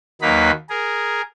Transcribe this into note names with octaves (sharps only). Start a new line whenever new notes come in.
D#2 F#3 A#3 D#4 B4 B5
G#4 A#4